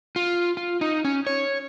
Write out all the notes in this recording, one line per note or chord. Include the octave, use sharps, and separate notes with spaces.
F4
F4
D#4
C#4
C#5